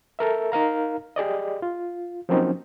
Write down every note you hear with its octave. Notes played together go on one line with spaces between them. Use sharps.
A4 A#4 E5
D#4 A#4 F5 A#5
G4 G#4 D5 D#5
F4
F3 F#3 A#3 C4 C#4 D#4